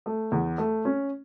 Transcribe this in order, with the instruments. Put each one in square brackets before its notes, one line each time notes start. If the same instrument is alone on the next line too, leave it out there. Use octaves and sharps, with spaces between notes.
[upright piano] A3
E2
A3
C#4